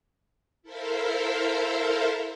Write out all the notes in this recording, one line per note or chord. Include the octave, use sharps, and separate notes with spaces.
E4 A4 A#4 C5 E5 F5